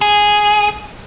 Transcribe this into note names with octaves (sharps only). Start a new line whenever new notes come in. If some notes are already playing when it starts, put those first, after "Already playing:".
G#4